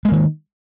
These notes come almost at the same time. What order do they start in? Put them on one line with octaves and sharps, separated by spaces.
G#3 A#3 D#3